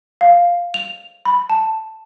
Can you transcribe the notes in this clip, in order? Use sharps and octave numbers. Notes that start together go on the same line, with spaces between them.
F5
F7
B5
A5